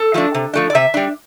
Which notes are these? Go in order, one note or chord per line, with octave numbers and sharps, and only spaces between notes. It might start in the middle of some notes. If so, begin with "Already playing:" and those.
Already playing: A4
F3 A3 D4
C3
F3 A3 D4
D5
C3 E5
G3 D4